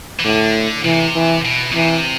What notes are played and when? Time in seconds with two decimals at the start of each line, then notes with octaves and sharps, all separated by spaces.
0.19 E3
0.25 A2 D3
0.85 C3 E3
1.16 E3
1.45 B2
1.71 B2
1.75 C3 E3